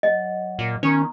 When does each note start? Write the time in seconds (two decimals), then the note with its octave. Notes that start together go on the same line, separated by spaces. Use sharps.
0.03 F#3 C#5 D#5 F#5
0.59 A#2
0.83 D#3 B3 C#4 A#5